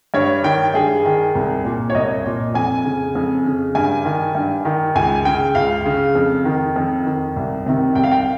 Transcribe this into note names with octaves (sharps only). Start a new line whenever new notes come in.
G2 C#5
D#3 G5
G2 G#4
D#3
C2
A#2
C#5
C2 D#5
A#2
F2 G#5
C#3
F2
C#3
G2 G#5
D#3
G2
D#3
C#2 G#5
C#3 G5
C#2 F5
C#3
F2
D#3
F2
D#3
C2
C3 D#3
C2 G5
F5
G5